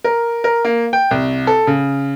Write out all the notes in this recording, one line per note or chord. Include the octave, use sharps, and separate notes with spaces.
A#4
A#4
A#3
G5
C2
A4
C#3